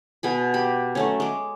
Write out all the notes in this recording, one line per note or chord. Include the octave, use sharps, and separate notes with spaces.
B2 G#4 B5
G4 B5
F#3 A3 C#4
G#3 D6